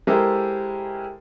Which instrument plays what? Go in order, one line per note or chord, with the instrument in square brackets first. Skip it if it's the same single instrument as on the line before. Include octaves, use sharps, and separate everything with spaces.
[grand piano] G#3 E4 G4 A4 A#4 C5